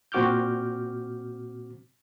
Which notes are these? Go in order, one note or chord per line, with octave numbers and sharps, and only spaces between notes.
A#2 C4 F#4 D6 F6 G6